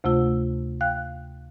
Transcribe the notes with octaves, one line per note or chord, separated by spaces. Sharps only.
D2 C3 A3 F4 E6
F5 G5 F#6